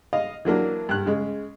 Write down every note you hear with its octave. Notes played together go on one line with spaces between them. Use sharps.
D#5 F5
E3 F#3 A#3 D4
G2 F#6
C#3 G#3